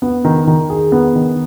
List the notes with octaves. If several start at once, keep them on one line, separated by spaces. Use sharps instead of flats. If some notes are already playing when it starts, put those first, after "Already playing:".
B3
D#3
D#3
G#4
B3
D#3